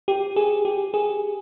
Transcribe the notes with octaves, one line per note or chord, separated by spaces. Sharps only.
G4
G#4
G4
G#4